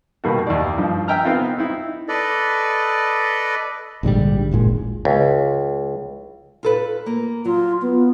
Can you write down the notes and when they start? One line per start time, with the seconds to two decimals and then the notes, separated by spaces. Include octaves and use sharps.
0.24 B2 D#3 G3 A#3 B3 F#4
0.47 D#2 E4 D5
0.77 G2 F3 D#4
1.08 E5 G5 G#5 A#5 F6
1.24 B3 C4 D#4 F4 F5
1.58 C4 D#4 E4
2.09 A4 B4 D5 D#5
4.03 A#1 G#2 D3 G3
4.51 D1 G#1 A#2 G#3
5.05 C#2
6.63 F4 A4 B4
7.06 A#3
7.45 F#3 F4
7.82 B3